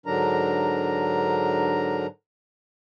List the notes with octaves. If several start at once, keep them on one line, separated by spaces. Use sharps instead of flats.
G#2 D3 F#3 D4 A#4 A#5